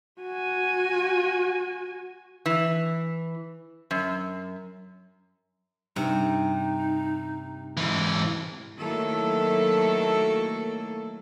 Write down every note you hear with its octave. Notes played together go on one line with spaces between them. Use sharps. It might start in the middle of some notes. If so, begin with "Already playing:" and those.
F#4 G#5
E3
F#2
G2 C3 D#4
G#2 E3
D#3 F#3 A3 A#3 E4 A4